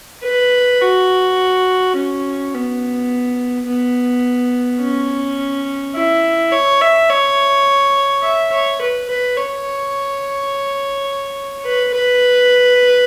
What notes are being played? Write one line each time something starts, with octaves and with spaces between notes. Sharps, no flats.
B4
F#4
C#4
B3
B3
C#4
E4
C#5
E5
C#5
E5
C#5
B4
B4
C#5
B4
B4